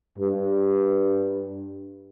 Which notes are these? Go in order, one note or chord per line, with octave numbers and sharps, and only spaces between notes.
G2